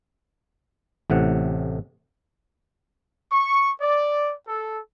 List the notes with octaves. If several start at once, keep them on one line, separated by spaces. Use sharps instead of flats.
A1 A2 C3 F#5
C#6
D5
A4